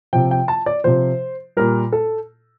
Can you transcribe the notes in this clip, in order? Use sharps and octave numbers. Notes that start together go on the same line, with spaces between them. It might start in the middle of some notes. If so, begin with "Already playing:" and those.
C3 F3 G5
G5
A5
D5
C3 F3 C5
A#2 G3 A#4
A4